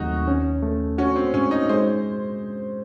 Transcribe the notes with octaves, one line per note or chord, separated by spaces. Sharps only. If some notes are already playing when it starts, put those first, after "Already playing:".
Already playing: D#2 F#3 A3 C4 D#4 F#4
C#4
A3
C#4 F#4
C4
G#2 C#4
D#4
G#3 C5